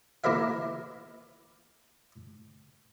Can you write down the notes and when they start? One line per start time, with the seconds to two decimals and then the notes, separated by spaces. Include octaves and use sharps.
0.24 A#3 E4 A#4 B4 E5 F5